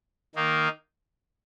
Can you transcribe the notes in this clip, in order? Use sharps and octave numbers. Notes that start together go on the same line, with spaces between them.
D#3 A#3 D#4